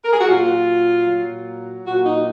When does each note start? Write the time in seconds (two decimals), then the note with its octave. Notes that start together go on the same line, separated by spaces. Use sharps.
0.04 A#4
0.13 G#4
0.20 F#4
0.29 A#2 F#3 F4
1.07 A#2 F#3
1.85 A#2 F#3 F#4
2.05 D#4